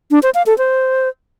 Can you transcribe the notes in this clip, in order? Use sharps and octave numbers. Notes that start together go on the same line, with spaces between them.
D4
C5
F5
A4
C5